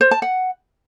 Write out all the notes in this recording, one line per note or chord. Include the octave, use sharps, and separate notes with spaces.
C5
A5
F#5